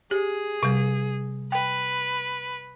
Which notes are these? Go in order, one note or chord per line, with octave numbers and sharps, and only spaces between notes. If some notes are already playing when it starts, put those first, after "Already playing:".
G4 G#4
C3 G3
B4 G5